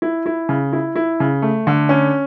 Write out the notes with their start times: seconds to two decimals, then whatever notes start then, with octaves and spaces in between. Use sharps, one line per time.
0.02 E4
0.26 E4
0.49 C#3
0.73 E4
0.96 E4
1.20 C#3
1.42 A3
1.67 D3
1.89 C#4